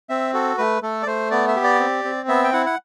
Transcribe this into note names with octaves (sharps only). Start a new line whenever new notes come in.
C4 E5
F#4 A4
A3 B4
A3 A4
D5
A3 C5
B3 D5
E5
G4
D5
C4
C4
B3 E5
G5
E4 F#5
F#5